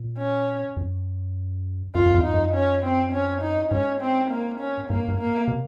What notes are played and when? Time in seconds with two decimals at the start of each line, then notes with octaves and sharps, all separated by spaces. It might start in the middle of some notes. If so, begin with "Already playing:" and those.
Already playing: A#2
0.18 C#4
0.77 F#2
1.95 F#2 F4
2.06 F#2
2.14 F2
2.24 G#2 D#4
2.34 F#2
2.54 C#4
2.83 C4
3.12 C#4
3.42 D#4
3.71 G#2 C#4
4.01 C4
4.31 A#3
4.60 C#4
4.89 G#2 A#3
5.08 G#2
5.19 A#3
5.48 C3